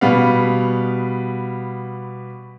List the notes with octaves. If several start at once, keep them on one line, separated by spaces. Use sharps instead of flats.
B2 G3 B3 F5